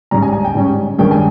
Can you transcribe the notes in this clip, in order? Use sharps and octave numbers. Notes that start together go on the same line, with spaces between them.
G#2 G3 C#4 A#5
G#5
G#5
G5
G#2 G3 C#4
G2 D#3 G#3 C#4 G5
G#5